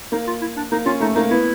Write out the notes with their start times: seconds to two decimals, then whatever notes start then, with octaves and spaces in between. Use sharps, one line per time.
0.12 A#3 D#4
0.27 F4
0.41 E4
0.57 D4
0.72 A#3 D#4
0.86 C#4 F4
1.00 A3 D#4
1.15 A#3 D#4
1.31 B3 E4